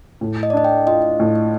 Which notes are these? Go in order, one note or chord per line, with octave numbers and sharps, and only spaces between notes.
A2
D#5
D5
D4 D#5
G5
F4 D#5
A2